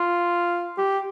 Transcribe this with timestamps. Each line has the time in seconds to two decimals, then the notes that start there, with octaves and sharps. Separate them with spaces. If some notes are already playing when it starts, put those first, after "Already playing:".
Already playing: F4
0.78 G4